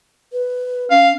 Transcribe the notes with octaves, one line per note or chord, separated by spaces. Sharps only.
B4
C#4 F5